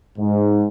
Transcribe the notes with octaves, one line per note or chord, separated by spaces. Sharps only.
G#2